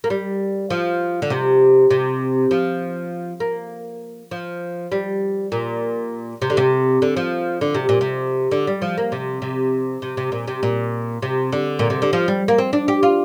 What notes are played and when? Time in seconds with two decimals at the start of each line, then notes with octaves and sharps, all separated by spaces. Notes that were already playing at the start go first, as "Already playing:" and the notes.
0.04 A#3
0.10 G3
0.70 F3
1.22 D3
1.30 C3
1.91 C3
2.51 F3
3.40 A#3
4.31 F3
4.92 G3
5.52 A#2
6.42 C3
6.50 D3
6.57 C3
7.02 D3
7.17 F3
7.61 D3
7.75 C3
7.89 A#2
8.01 C3
8.51 D3
8.67 G3
8.82 F3
8.98 A#3
9.12 C3
9.42 C3
10.02 C3
10.17 C3
10.32 A#2
10.48 C3
10.63 A#2
11.22 C3
11.52 D3
11.79 A#2
11.90 C3
12.02 D3
12.13 F3
12.28 G3
12.48 A#3
12.58 C4
12.73 D4
12.88 G4
13.03 F4